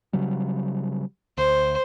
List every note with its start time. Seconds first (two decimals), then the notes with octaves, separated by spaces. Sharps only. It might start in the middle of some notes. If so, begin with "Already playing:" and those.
0.13 C#3 F#3 G3
1.38 D2 C5